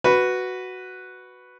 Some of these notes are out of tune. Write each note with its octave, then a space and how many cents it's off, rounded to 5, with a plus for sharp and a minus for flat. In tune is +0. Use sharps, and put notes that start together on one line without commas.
F#4 +0 B4 +0